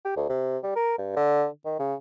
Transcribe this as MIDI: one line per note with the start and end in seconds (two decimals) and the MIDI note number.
0.05 0.15 67
0.16 0.27 38
0.30 0.58 48
0.63 0.73 55
0.76 0.95 70
0.98 1.16 43
1.17 1.46 50
1.65 1.74 51
1.79 1.94 49